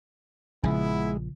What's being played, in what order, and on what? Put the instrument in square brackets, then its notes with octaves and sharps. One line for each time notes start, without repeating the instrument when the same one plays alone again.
[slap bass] A#1 F3 [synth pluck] C#3 [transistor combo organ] G#3 [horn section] B3 E4